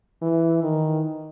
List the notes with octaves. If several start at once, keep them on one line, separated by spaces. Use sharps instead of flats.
E3
D#3